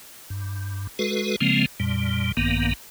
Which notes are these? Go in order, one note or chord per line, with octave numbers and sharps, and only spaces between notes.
G2
G#3 F#4 A4 B4
C#3 F3 G#3 A#3 C4
F2 A#2 G3
A#1 G2 D#3 A#3 B3